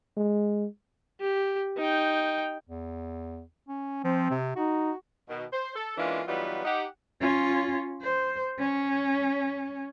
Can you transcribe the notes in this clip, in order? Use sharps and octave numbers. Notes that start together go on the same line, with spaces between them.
G#3
G4
D#4 G5
E2
C#4
F3 C4
C3
D#4 F#4
B2 D#3
C5
A4
E3 G#3 A#3 C#4 D4 F4
E3 F#3 G3 B3 D#4 F4
D#4 G4 F#5
C#4 F4
C5
C#4